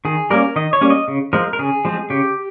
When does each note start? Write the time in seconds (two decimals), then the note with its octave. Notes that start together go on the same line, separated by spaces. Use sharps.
0.05 D#3 G#4
0.30 G3 A#3 C#4 A#4
0.56 D#3 D#5
0.73 C#5
0.81 G3 A#3 C#4
0.90 D#5
1.08 C#3
1.33 F3 G#3 C4 A#4
1.53 A#4
1.59 C#3 G#4
1.85 F3 G#3 C4
2.10 C#3 G4